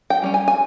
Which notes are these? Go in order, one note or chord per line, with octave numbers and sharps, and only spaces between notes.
G5
G3 A#3 C#4
G#5
G#5